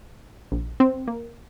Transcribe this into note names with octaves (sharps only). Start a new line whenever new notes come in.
A#1
C4
A#3